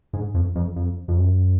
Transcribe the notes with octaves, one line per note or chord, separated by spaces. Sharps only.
G#2
F2
F2
F2
F2
F#2